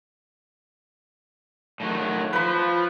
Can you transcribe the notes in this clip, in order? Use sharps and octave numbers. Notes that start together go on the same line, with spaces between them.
A2 D#3 F#3
F3 B4 B5